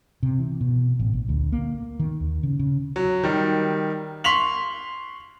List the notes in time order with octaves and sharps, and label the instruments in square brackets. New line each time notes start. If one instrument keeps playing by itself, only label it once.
[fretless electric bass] C3
E3
B2
A1
A#1
D2
A#3
D#3
D#2
C#3
C#3
[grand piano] F#3
D#3 G3
C6 C#6 B6 F7 F#7